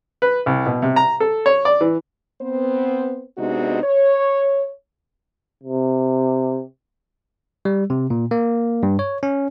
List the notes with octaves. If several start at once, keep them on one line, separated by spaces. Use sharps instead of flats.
B4
C2
B2
C3
A#5
A4
C#5
D5
E3
B3 C4 C5
C3 G#3 B3 D4 D#4 F#4
C#5
C3
G3
C3
A#2
A#3
G2
C#5
C#4